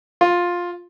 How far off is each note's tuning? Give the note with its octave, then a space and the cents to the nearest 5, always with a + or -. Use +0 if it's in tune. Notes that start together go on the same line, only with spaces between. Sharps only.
F4 +10